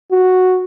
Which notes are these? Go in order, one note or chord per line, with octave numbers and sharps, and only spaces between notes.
F#4